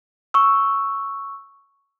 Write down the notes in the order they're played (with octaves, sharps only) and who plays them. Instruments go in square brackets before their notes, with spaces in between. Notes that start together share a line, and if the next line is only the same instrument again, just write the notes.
[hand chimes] C#6 E6